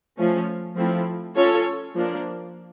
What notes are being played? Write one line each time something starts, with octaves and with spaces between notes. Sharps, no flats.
F3 A3 C#4
F3 A3 C4 E4
C#4 F4 A4 C#5
F3 A#3 D4